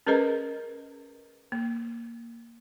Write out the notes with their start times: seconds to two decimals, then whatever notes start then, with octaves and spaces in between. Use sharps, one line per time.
0.07 C#4 G#4 A#4 B4 D#5 A#5
1.52 A#3